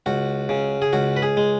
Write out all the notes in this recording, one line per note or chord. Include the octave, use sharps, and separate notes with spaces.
C#2 F#4
C#3
G#4
C#2 F#4
B4
G#4
G#3